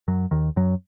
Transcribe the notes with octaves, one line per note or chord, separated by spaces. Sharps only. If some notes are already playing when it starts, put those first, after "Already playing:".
F#2 F#3
D#2 D#3
F#2 F#3